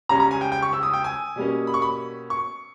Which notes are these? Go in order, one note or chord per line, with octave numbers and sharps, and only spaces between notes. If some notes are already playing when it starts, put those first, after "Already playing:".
C#2 C#3 G3 C#4 A#5
A#5
G#5
G5
G5
C#6
E6
D#6
G5
G#5
B2 G3 A#3 C#4
B5
C#6
B5
C#6